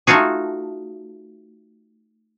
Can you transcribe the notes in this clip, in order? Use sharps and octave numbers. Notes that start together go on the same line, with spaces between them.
A3 D#4 F4 F#4 G#4